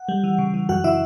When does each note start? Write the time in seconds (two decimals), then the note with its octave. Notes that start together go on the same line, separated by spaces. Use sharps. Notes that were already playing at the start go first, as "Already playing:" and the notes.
Already playing: F#5
0.09 G3
0.24 E3
0.38 C#3
0.54 E3
0.69 F#2 F#4 F#5
0.84 C#3 E4 E5